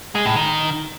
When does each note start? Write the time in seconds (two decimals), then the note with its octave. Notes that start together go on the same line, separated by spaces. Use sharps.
0.15 G#3
0.26 A2
0.36 D#3